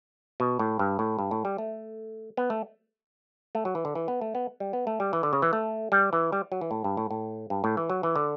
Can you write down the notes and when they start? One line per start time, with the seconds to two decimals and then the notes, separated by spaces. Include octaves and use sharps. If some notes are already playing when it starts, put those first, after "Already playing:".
0.40 B2
0.59 A2
0.79 G2
0.99 A2
1.19 G2
1.31 A2
1.45 G3
1.58 A3
2.37 B3
2.50 A3
3.55 A3
3.65 F#3
3.75 E3
3.85 D3
3.95 E3
4.08 B3
4.21 A3
4.35 B3
4.60 G3
4.73 B3
4.87 A3
5.00 G3
5.13 E3
5.23 D3
5.33 C#3
5.42 E3
5.53 A3
5.92 G3
6.13 E3
6.32 G3
6.52 F#3
6.61 E3
6.71 A2
6.84 G2
6.97 A2
7.11 A2
7.50 G2
7.64 A2
7.77 E3
7.90 F#3
8.03 E3
8.16 D3